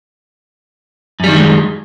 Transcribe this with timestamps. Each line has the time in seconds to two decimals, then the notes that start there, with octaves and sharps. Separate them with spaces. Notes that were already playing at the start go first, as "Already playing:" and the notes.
1.20 F#2
1.24 G3
1.28 D#3
1.32 D3
1.36 G#3